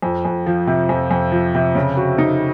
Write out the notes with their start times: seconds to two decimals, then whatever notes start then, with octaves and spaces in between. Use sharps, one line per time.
0.02 F2
0.25 F2
0.46 F3
0.67 C3
0.89 F2
1.11 F2
1.32 F3
1.55 C3
1.75 C#3
1.97 F#4
2.18 D#4